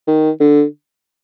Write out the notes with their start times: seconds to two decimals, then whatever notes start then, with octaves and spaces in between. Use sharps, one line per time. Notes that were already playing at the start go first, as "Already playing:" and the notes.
0.07 D#3
0.40 D3